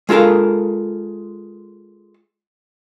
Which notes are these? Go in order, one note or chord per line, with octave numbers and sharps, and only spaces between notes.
G#3 F4 A4 A#4 F5